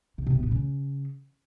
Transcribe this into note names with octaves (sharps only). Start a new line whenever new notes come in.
C#3
C3
B3
A#2
C#3